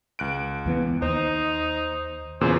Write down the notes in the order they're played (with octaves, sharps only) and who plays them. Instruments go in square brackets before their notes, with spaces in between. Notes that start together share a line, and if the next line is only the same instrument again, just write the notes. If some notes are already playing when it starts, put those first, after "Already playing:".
[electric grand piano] C#2 F#6 D7
[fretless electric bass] D#2 E3 B3
[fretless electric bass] D#2 [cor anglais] D#4 [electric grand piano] C5
[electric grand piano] E2 A#2 C#3 [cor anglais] C5